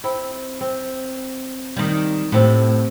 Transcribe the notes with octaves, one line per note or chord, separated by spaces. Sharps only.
C4 E4
C4
D#3 G3
A2 C3 C4 F#5